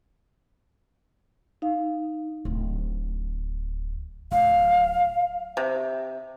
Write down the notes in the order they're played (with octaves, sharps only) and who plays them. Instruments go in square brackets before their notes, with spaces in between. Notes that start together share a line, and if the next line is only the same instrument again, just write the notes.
[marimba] D#4 F5
[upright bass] D1
[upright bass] D1 [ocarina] F5
[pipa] C3